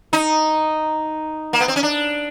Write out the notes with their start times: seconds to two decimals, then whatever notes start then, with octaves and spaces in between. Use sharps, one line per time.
0.13 D#4
1.53 A#3
1.60 B3
1.68 C4
1.76 C#4
1.83 D4